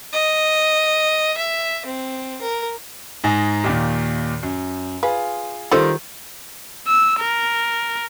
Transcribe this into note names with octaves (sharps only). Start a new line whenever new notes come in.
D#5
E5
C4
A#4
G#2 D#4 G#5
D#2 A#2 D#3
F#2
F4 G#4 B4
D#3 G3 F4 A4 C5
E6
A#4